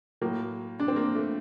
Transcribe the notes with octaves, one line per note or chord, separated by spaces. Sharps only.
A2 F#3 A#3
D4
C4
A#3
A3